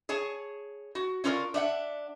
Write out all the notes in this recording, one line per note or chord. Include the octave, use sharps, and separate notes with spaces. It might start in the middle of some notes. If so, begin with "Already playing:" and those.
G#4 C#5 A5
F#4
C#4 D4 F4 A4 A#4
D4 E5 F#5